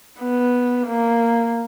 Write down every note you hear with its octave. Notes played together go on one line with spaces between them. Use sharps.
B3
A#3